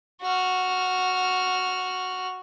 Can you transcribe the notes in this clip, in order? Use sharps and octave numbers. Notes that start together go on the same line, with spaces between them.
F#4 F6